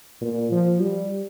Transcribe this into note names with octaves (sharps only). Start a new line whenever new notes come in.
A#2
F3
G3